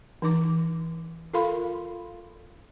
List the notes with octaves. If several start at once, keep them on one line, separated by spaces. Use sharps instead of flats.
E3 D#4 D6
F4 A4 A#4 F5 B5 C6